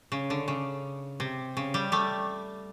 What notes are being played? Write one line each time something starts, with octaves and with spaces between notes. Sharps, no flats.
C#3
D3
C#3
C3
C#3
G3
G3 A3